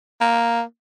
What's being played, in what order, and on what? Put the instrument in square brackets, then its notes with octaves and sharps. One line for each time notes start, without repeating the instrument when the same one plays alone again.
[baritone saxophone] A#3